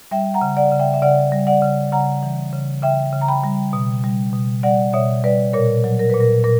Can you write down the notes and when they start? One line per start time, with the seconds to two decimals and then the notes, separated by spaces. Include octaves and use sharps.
0.11 G3 E5 G5
0.34 F#5 A#5
0.41 C#3
0.57 D5 F#5
0.72 C#3
0.79 E5 G5
0.94 E5
1.02 C#3 D5 F#5
1.32 G3
1.47 D5 F#5
1.62 C#3
1.92 C#3 F#5 A#5
2.23 E3
2.53 C#3
2.83 C#3 E5 G5
3.13 C#3
3.21 A#5
3.28 G5 B5
3.44 G3
3.73 B2
4.04 G3
4.33 B2
4.63 G3 D5 F#5
4.93 B2 C#5 E5
5.24 G3 B4 D5
5.53 A#2 A#4 C#5
5.84 F#3
5.99 A#4
6.10 A#2 B4
6.20 A#4
6.44 A#2 A#4